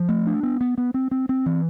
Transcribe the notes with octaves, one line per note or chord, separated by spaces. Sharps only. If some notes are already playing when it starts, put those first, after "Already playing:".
Already playing: F3
A3
D4
B3
B3
B3
C4
C4
C4
E3